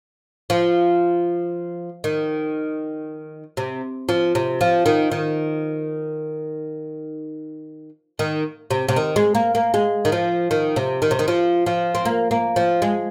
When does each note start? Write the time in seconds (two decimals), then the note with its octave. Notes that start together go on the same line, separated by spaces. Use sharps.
0.50 F3
2.04 D#3
3.57 C3
4.09 F3
4.35 C3
4.61 F3
4.86 D#3
5.12 D#3
8.19 D#3
8.71 C3
8.88 C3
8.96 D#3
9.16 G#3
9.35 A#3
9.55 A#3
9.74 G#3
10.05 D#3
10.12 F3
10.51 D#3
10.76 C3
11.02 D#3
11.11 C3
11.19 D#3
11.28 F3
11.66 F3
11.95 C4
12.05 A#3
12.31 A#3
12.56 F3
12.82 G#3